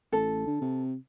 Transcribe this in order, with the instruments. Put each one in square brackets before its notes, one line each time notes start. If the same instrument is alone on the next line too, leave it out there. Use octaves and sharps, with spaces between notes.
[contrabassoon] A1 [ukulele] A4
[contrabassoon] D3
C3